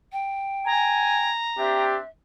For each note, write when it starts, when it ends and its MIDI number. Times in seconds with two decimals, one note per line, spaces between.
0.13 1.30 79
0.66 1.33 80
0.66 1.84 82
1.58 1.98 60
1.58 1.98 62
1.58 1.98 67
1.58 2.09 76